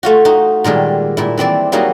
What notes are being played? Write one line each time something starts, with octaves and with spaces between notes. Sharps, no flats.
A3 F4 F#4
D#4 F#4
A#2 D#3 G3 G#3
A#2 E4
E3 C4 E4 D5
F#3 G3 A#3 D#4 F#4 G#4